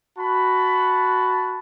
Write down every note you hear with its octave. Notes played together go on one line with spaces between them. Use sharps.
F#4 A5 B5